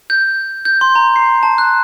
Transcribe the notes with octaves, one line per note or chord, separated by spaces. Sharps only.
G6
G6
C6
A#5
C7
A5
F#6